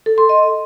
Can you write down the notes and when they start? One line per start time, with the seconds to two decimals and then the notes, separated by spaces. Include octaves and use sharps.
0.06 A4
0.18 C6
0.29 D#5